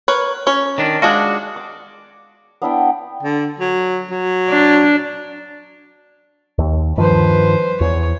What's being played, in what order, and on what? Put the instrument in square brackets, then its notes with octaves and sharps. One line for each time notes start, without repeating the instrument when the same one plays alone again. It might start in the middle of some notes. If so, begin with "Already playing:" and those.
[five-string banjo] A#4 B4 C#5
C#4 C#5
[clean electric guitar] D#3 D4
[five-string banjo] G#3 D4 F4 [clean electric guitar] F#4
[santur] D6
B3 D4 E4 G5
[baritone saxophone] D3
F#3
F#3
[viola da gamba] D4
[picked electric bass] D#2
[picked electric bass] G2 D#3 F3 [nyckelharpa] B4 C5
[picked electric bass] E2 [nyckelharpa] C#5